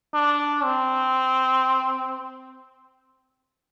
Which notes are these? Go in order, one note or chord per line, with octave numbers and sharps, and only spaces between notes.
D4
C4